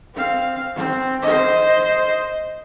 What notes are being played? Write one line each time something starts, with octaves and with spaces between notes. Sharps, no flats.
C4 F5
C4
C5 D#5